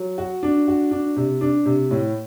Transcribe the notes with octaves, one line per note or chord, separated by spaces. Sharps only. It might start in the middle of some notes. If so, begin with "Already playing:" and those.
Already playing: F#3
F#4
D4
F#4
D4
C3
D4
C3
A2